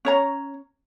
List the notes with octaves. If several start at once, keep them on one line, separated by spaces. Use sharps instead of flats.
C#4 C#5 A#5